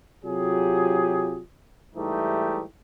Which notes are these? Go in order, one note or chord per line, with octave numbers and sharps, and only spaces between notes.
C3 F#3 F4 G4 G#4
G#2 E3 G3 A3 D#4 G4